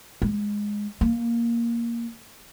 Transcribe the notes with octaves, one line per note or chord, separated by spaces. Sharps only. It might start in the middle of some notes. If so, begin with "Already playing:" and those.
G#3
A#3